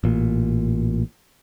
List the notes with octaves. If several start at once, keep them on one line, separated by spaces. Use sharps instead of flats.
A1 A#2